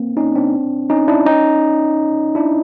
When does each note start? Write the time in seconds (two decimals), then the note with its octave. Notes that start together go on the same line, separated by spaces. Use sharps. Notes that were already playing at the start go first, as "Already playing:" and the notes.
Already playing: A#3 C4
0.17 C#4 D#4
0.35 C4 D4
0.90 C#4 D#4
1.08 D4 E4
1.26 C#4 D#4
2.35 D4 E4